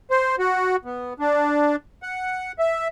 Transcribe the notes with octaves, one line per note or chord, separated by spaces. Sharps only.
C5
F#4
B3
D4
F#5
E5